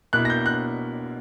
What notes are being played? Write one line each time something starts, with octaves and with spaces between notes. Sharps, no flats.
B2 A#3 E4 F#6
A#6
G6
F#6